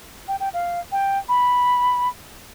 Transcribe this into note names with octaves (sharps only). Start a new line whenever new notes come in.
G5
G5
F5
G5
B5